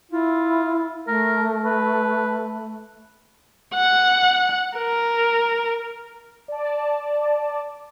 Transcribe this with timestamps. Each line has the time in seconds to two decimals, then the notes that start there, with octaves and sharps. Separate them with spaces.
0.12 E4 F4
1.07 A3 A#4
1.65 B4
3.75 F#5
4.78 A#4
6.48 D5 A5